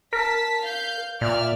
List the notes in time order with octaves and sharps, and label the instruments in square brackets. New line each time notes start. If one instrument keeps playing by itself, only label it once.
[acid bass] A#4 [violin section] A5 B6
[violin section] F5 G6
[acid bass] A#2 [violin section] D5 E5 F6